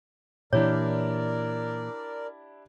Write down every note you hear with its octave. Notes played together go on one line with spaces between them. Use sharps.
A#2 E3 D4 E4 G4 A#4 C#5 D5